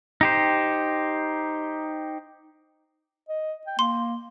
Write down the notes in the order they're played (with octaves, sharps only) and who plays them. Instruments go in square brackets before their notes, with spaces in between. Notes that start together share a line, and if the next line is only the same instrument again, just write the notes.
[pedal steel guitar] D#4 G4 C5
[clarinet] D#5
G5
[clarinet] A#3 [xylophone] C6